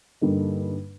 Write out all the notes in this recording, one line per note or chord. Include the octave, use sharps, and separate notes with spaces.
G2 D3 G3 A#3 D#4